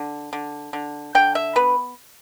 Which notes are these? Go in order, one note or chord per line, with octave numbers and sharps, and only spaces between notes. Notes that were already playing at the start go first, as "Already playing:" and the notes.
Already playing: D3
D3
D3
D3 G5
E5
B3 B4